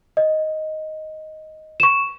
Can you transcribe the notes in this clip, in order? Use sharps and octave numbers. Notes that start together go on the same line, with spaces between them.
D#5
C#6 E7